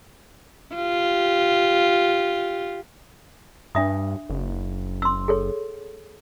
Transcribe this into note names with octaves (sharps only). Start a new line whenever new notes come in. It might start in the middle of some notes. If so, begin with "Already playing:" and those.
F4 G4
G2 D4 E5 D#6
F#1
C6 E6
G#4 A4 C#5